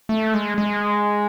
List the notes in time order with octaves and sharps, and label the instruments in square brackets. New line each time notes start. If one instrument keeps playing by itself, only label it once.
[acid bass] A3
G#3
G#3